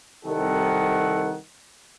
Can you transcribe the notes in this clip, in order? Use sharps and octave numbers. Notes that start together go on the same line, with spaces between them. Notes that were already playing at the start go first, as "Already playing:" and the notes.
C2 D#3 A4 F#5